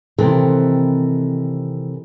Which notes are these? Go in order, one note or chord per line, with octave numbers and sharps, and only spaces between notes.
C3 D#3 E3 C4 A4 A#4